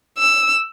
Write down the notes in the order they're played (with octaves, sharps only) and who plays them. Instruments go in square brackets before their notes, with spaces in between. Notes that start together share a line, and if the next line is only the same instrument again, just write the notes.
[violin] E6